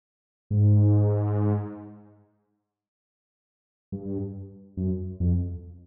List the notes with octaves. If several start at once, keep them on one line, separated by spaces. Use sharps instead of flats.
G#2
G2
F#2
F2